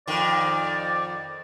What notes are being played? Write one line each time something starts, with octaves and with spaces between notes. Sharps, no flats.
F2 D#3 D5